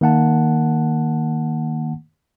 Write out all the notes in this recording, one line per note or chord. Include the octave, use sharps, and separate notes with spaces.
D#3 A#3 F#5 A5